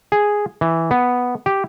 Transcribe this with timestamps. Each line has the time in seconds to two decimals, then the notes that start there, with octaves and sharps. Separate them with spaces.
0.12 G#4
0.61 E3
0.91 B3
1.46 G4